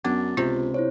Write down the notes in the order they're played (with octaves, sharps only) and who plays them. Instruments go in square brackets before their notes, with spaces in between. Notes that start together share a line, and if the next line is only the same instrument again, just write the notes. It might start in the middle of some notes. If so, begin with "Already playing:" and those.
[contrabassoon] F#2 [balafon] B3 [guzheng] D4 [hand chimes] A6
[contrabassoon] C#2 [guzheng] C3 [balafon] F4
[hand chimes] E4 C5 C#5